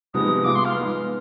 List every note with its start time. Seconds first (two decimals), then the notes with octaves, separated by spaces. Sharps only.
0.14 C3 F3 G#3 B3 D#4 D#6
0.44 G#3 B3 F4 D6
0.55 C6
0.65 F5
0.75 G#3 B3 D#4